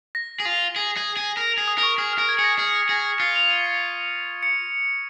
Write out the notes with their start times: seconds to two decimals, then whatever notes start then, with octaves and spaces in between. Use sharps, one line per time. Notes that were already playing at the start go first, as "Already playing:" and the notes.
0.15 A#6
0.40 G#4
0.45 F4
0.76 G#4
0.97 G#4
1.17 G#4
1.37 A#4
1.52 F7
1.58 G#4
1.68 D#6
1.78 A#4
1.83 C#6
1.98 G#4 F6
2.13 F6
2.18 A#4
2.29 G#6
2.38 G#4 C#7
2.44 A#6
2.59 G#4 F6
2.89 G#4 A#6
3.20 F4 C#7
3.36 F7
3.50 D#7
3.66 C#7
4.43 C#7